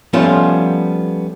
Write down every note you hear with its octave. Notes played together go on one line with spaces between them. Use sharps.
F3 G3 A3 B3 C#4 F4